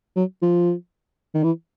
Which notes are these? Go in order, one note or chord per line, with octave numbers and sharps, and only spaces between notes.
F#3
F3
D#3
E3